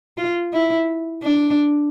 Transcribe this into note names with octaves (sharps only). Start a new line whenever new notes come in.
F4
E4
D4